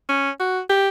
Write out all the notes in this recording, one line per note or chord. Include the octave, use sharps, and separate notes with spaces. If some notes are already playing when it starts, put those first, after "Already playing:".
C#4
F#4
G4